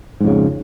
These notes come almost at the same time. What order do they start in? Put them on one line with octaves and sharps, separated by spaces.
G#2 F2 C#3